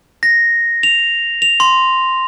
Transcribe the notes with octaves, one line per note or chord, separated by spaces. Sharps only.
A#6
F7
F7
C6